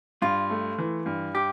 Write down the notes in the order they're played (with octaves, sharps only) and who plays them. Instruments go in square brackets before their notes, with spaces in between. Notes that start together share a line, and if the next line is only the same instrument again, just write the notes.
[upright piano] G2 [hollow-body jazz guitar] F4
[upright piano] A3
E3
G2
[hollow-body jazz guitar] G4